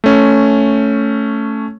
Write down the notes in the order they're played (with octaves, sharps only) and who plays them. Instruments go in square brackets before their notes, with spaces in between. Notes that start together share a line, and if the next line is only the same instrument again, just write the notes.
[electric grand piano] A3 C#4